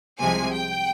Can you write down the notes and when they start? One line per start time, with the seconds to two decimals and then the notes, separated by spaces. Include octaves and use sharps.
0.20 C2 C3 F3 G#3 G#5
0.52 G5